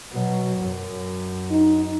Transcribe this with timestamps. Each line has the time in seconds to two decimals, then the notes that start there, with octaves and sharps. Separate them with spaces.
0.11 B2 F#3
0.57 F#2
1.51 D#4